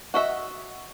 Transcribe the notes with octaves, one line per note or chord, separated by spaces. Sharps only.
F#4 D#5 E5